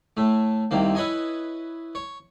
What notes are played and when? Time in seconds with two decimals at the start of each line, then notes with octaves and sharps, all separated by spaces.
0.17 A2 A3
0.71 C2 C3 D#3 A#3
0.95 E4 B4 C#5 D#5 G#5
1.95 C#5